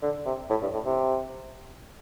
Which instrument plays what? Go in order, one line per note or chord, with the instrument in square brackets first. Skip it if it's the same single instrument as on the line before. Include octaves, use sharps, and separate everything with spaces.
[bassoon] D3
C3
A2
G2
A2
C3